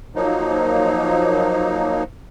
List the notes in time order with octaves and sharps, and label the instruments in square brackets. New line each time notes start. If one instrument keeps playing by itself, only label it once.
[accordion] F3 F#3 A#3 D#4